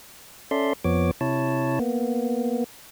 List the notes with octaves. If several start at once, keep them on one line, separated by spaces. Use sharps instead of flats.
C#4 A4 D5 E5 C6
F2 F3 B3 C#5 D6
C3 E4 C#5 A5
A#3 B3